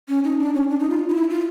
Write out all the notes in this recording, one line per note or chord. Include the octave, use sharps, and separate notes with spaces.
C#4
D#4
D4
C#4
D4
D#4
F4
D#4
E4
F4